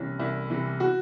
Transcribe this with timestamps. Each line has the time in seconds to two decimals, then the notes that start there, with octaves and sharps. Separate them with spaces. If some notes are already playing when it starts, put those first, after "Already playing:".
Already playing: C2 C3 E3 C#4
0.19 C2 E4
0.50 C3 E3
0.80 F#4